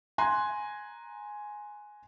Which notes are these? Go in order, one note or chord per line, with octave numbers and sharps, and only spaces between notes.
G#5 A#5 C6 F#6